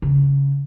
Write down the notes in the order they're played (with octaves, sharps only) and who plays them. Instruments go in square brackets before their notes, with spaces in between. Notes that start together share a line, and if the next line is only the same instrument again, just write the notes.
[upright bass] C#3